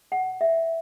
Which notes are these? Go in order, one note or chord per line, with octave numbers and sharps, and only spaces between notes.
F#5
E5